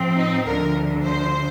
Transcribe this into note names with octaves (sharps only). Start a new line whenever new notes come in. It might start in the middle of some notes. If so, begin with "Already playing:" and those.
Already playing: A2 F3 C4
D#4
D2 D3 F3 A#4
C5